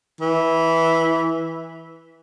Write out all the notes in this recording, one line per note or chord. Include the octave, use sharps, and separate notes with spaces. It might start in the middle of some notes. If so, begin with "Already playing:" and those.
E3